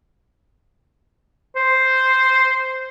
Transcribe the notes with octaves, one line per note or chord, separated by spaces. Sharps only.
C5